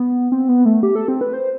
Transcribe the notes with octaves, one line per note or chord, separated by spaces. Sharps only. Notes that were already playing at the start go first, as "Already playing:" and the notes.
Already playing: B3
C4
B3
A3
G4
A4
C4
B4
C5